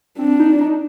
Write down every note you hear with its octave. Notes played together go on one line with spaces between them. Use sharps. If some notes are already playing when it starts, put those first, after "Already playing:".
C4 D4
D#4
D#4